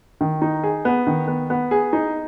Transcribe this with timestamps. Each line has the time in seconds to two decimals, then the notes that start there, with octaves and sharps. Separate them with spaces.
0.21 D#3
0.42 D#4
0.64 G#4
0.85 B3
1.07 D#3
1.28 B3
1.50 B3
1.71 G#4
1.93 D#4